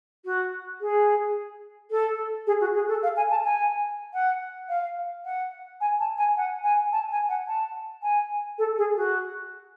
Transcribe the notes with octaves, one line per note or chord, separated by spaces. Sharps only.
F#4
G#4
A4
G#4
F#4
G#4
A4
F5
G#5
A5
G#5
F#5
F5
F#5
G#5
A5
G#5
F#5
G#5
A5
G#5
F#5
A5
G#5
A4
G#4
F#4